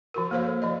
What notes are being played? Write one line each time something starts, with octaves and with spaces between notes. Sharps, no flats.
F3 F#4 A#4
A#3 A4 C5 C#5 F5
F3 D5 D#5